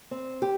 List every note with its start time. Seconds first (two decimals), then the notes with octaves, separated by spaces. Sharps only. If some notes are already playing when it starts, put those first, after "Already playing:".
0.11 C4
0.42 G4